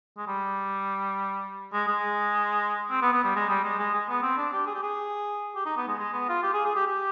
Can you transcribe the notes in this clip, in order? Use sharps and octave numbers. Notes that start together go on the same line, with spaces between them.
G#3
G3
G#3
G#3
C4
B3
B3
G3
G#3
G3
G#3
G#3
G#3
B3
C4
D4
G4
G#4
G4
G#4
G4
D#4
B3
G#3
G#3
B3
F4
G4
G#4
G#4
G4
G4